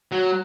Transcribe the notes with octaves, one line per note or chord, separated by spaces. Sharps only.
F#3